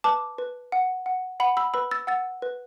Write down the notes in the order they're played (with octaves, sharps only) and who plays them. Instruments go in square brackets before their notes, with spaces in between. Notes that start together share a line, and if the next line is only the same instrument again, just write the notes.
[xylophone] B4 A5 D6
B4
F#5
F#5
F#5 B5
B5 E6
B4 B5 E6
E6 A6
F#5 E6 A6
B4